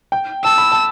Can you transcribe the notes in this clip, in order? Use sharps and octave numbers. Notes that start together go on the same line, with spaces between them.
G5
A5 E6
B5
A5